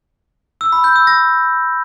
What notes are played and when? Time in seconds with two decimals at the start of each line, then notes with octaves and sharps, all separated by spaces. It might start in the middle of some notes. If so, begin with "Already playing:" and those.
0.61 E6
0.72 B5
0.84 G6
0.96 E6
1.07 A#6